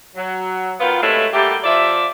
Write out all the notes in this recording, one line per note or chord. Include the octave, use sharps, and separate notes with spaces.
F#3
D#3 B3 F4
A2 C3 F#3 G#3 A3 E4
F#3 G3 A3 A#3 G4
F3 D5 E5